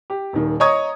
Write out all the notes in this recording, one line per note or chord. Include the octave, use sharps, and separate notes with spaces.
G4
D#1 D#3
C#5 D#5 A#5 C#6 D#6 G#6